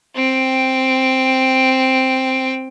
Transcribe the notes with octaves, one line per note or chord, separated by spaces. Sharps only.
C4 G5